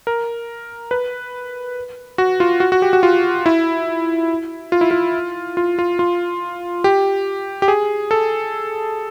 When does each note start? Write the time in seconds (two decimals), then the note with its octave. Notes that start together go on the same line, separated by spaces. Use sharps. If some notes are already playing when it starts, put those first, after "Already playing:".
0.07 A#4
0.91 B4
2.18 F#4
2.40 F4
2.60 F#4
2.72 F#4
2.82 G4
2.93 F#4
3.03 F4
3.46 E4
4.72 F4
4.81 E4
4.91 F4
5.57 F4
5.79 F4
5.99 F4
6.84 G4
7.62 G4
7.68 G#4
8.11 A4